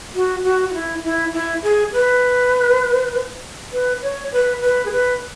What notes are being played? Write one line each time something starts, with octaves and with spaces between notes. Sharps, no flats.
F#4
F#4
F#4
E4
E4
E4
G#4
B4
B4
C#5
B4
B4
G#4
B4